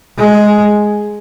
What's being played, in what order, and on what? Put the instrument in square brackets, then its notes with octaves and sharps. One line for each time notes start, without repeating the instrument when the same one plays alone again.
[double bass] G#3